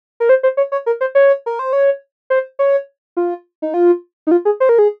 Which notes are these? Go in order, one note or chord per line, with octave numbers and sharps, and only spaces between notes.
A#4
C5
C5
C#5
C#5
A#4
C5
C#5
A#4
C5
C#5
C5
C#5
F4
D#4
F4
D#4
F4
G#4
C5
A#4
G#4